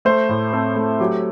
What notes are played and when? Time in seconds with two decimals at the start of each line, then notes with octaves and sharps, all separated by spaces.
0.05 A3 C5
0.29 A2
0.53 C4 A4
0.76 A3
1.00 F#3 G4